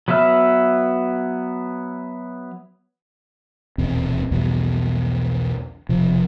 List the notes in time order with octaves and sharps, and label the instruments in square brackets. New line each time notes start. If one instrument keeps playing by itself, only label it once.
[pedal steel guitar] F#3 B3 B4 E5 F6
[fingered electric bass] D#1 B1 E2 C4
B1 E2 B2 G3
E1 C3 F3